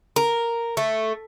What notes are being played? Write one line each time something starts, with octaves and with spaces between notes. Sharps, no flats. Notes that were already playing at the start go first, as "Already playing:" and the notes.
A#4
A3